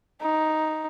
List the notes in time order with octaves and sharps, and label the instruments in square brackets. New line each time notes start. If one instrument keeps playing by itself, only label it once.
[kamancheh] D#4